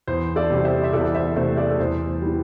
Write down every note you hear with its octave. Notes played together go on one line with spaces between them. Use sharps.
E2 C5
A4 D5
C3 G3 C4
C5 E5
E5
E2 A4 D5
C5 E5
C3 A3 C4 C5 E5
A4 D5
A4
E2 C5
C5
E3 G3